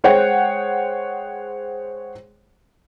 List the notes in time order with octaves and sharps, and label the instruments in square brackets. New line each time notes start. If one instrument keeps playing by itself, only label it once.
[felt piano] G#3 C5 C#5 F#5 G5